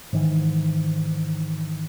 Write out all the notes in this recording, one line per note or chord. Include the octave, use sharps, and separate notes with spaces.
G#2 D#3 E3